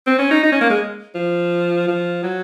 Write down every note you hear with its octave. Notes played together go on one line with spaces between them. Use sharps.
C4
C#4
D#4
D#4
C#4
A#3
G#3
F3
F3
F#3